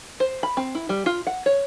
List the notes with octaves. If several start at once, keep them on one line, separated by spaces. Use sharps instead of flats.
C5
B5
C4
E4
G3
F4
F#5
C#5